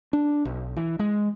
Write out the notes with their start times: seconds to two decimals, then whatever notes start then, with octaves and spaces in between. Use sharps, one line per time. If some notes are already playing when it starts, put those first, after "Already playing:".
0.13 D4
0.45 B1
0.77 E3
0.99 G#3